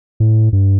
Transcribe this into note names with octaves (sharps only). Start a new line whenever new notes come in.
A2
G2